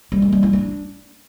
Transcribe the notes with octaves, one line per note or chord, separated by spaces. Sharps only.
G3
A#3
G3
E4
D4